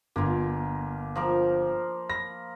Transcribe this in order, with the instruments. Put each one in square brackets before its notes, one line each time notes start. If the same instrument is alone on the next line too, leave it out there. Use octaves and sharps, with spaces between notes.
[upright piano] G1 [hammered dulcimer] A#3 F4
[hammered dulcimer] F3 A#4 D6
[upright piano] B5 A#6